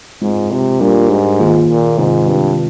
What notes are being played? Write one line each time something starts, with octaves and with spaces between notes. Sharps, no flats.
G#2 G#3 C4 F4
C3
A#2 G3 D4 G4 A#4
G#2
D#3 A#3 F4 G#4
A#2
G#2 C3 D#3 G#3 C4 F4
G2